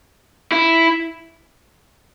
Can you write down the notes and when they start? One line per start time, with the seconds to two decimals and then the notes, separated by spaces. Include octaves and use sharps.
0.52 E4